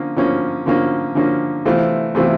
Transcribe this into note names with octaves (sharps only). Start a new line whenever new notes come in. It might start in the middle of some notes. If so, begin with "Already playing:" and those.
Already playing: D3 F3 A#3 C#4
D3 F3 A#3 C#4
D3 F3 A#3 C#4
D3 F3 A#3 C#4
C3 E3 A3 C4 F4
C3 E3 A3 C4 F4